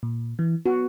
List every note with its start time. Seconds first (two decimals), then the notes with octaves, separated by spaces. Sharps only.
0.03 A#2
0.39 E3
0.66 B3 F#4